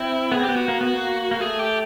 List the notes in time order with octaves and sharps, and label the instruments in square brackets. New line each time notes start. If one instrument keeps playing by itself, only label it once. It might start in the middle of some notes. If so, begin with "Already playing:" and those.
Already playing: [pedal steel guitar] C4 [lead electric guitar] E4
[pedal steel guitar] B3 [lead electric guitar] G#4
[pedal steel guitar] C4
[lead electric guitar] G4
[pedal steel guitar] B3
[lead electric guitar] F#4
[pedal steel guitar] A#3
B3
A#3
A#3
[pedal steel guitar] A3 [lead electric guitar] G#4
[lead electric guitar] G4